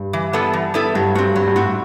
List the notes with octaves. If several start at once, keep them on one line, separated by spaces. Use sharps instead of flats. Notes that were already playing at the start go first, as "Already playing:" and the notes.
Already playing: G2
E3
G3 B3 E4 A4
E3
G3 B3 E4 A4
G2 F#3
G2 C4 F#4
G2 F#3
G2
A2 C4 F#4